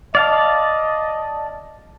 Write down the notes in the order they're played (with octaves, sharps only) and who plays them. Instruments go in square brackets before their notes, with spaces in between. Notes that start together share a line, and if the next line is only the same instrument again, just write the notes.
[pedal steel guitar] D5 F5 A5 [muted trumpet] D#5